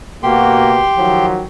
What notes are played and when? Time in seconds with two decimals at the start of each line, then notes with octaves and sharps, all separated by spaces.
0.23 B2 A#3 F#4 G4 G5 C6
0.97 D#3 F3 F#3